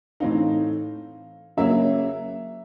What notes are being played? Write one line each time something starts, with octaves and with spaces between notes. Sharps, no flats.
A2 E3 A3 C4 D#4 F5
C#3 F#3 A#3 C#4 E5